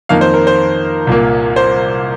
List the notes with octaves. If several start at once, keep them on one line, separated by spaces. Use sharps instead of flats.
F2 D#3 A#3 F5
C5
A#4
C5
C2 A#2 A#3
C5